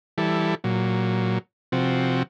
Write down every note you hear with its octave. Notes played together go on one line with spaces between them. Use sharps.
E3 G3 E4 A4
A#2 F#3
C3 F3 C4 F#4